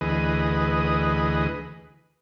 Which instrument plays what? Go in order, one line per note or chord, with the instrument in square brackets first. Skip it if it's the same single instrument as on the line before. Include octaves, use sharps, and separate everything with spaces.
[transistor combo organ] D2 E3 G#4 B4 D#5